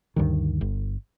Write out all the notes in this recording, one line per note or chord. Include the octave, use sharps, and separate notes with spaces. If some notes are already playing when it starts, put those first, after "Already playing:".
D2 G2 D#3
G1